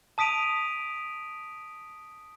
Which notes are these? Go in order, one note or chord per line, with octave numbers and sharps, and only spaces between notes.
A5 D#6 B6 D7 D#7 F7